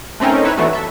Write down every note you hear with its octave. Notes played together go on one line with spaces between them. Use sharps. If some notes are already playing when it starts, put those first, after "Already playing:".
A3 C4 C#4 D#4 A#4
D#4 E4 B4 C#5 E5
E3 A3 B3 D4 F#4
A4 E5